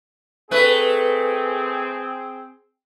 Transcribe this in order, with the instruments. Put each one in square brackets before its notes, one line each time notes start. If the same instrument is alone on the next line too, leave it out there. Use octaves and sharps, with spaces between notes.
[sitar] A3 B4 [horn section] C4 G#4